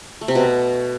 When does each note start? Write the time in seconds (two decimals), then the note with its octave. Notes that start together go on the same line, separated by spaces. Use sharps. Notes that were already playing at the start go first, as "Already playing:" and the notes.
0.21 A3
0.28 C3
0.35 B2